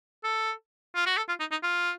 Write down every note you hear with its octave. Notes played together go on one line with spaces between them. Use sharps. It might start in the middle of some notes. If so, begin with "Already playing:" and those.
A4
F4
F#4
A4
F4
D#4
D#4
F4